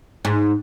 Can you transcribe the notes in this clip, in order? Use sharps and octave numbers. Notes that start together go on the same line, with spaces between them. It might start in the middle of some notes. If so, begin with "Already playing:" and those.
G#2